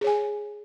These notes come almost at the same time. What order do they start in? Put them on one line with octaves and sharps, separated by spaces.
G#4 C#5 G#5